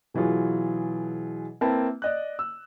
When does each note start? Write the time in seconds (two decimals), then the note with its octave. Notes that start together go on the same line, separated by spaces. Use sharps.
0.14 B2 E3 F#3 F4 G#4
1.61 A#3 C4 E4 B4 A5
2.02 D5 D#5 F#6
2.39 E6